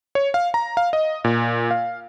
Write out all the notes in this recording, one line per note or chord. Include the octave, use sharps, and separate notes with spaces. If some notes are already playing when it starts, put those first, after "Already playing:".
C#5
F5
A#5
F5
D#5
A#2
F5